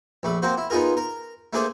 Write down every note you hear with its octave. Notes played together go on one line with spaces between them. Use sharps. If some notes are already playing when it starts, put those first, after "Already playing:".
A#1 A3 B5
A#3 C4 F#4 C5
E4
B3 D#4 F4 G#4 A#4
A#4
A3 A#3 D4 G#4 A4 C5